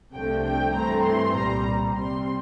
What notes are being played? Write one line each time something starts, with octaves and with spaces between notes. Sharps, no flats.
C2 C3 F3 A3 D4 G5
G5
G2 E3 A3 C4 A#5
C6
C2 A#2 G3 A#5
C3 G3 C4 C6